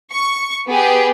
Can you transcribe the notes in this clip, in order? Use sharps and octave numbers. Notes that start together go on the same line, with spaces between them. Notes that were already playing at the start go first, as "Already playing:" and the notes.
C#6
B3 G4 G#4